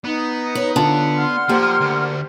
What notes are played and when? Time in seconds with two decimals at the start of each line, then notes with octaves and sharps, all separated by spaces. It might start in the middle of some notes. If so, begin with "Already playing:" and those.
0.04 B3 D#4
0.55 B4 C#5
0.76 D3 F4 A5
1.17 F#5 C6 F6
1.49 F3 A#3 G4 C5
1.81 D2